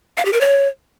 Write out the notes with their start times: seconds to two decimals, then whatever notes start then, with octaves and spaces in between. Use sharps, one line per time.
0.17 F5
0.25 G4
0.33 A#4
0.41 C#5